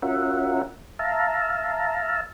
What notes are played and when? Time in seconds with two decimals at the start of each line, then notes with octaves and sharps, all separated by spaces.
0.02 C#4 F4 F#4 A#4 E5 F#5
0.99 E5 F5 A5 A#5